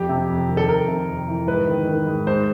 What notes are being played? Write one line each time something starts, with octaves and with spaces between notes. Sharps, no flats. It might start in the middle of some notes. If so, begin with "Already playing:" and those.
Already playing: F2 G4
C3
F2
D#3
A4
F2 A#4
C3
F2
E3
G#2 B4
D#3
D#3
G#2
G#2 C5